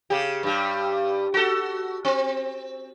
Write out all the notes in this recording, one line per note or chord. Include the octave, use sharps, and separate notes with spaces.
C#3 G4
G2 G3
F#4 A4
C4